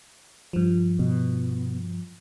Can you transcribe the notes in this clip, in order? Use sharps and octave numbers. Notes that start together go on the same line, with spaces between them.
G2 F3
B2